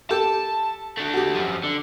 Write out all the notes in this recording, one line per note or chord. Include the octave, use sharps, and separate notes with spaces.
G4 A4 G5 A5
A3 D4
F#4 G4
F#2 F3
D3